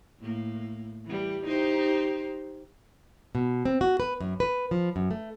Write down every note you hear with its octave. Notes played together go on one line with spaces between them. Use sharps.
A2 A#3
E3 G3
D#4 G4 C5
B2
C4
F#4
B4
F#2
B4
F3
F#2
A3